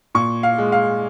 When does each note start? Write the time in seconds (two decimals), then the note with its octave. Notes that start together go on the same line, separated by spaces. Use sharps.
0.15 A#2 C#6
0.43 F5
0.58 G#3
0.72 F5